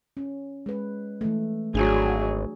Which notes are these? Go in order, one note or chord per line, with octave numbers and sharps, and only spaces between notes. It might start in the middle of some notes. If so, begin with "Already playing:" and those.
C#4
G#3 B4
E3 A3
G#1 F#3 A3 D4 G#4